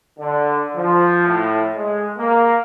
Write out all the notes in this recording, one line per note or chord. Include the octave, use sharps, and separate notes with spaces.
D3
F3
A2
G#3
A#3